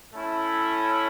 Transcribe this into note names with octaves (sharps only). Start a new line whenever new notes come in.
A3 C#4 E4